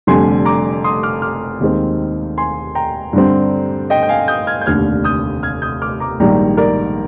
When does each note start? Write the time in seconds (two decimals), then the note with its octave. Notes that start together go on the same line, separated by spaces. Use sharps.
0.07 F1 F2 D3 G3 G#5 C6
0.45 A#5 D6
0.84 C6 D#6
1.03 D6 F6
1.22 D6 F6
1.61 D#2 D#3 G#3 C4
2.37 G#5 C6
2.75 G5 A#5
3.13 G2 D3 G3 C4
3.90 D#5 G5
4.03 G5
4.09 F5 G#5
4.28 D#6 G6
4.47 F6 G#6
4.61 G6
4.66 F1 D#2 D3 F6 G#6
5.05 D#6 G6
5.43 F6 G#6
5.62 D#6 G6
5.82 D6 F6
6.00 A#5 D6
6.20 A#1 G#2 D#3 G3 A#3 G5 A#5
6.57 A#4 D5